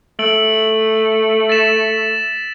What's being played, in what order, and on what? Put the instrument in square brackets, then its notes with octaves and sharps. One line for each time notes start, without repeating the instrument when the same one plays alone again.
[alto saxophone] A3 [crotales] E6 D7 F#7
[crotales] A6 B6 E7